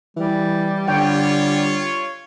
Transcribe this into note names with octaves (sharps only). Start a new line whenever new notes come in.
E3 G3
D3 F4 C#5 G5